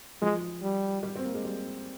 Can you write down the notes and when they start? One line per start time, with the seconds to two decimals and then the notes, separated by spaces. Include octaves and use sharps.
0.21 F3 G#3
0.62 G3
1.03 G3
1.16 C4
1.25 A#3
1.34 G#3
1.45 G3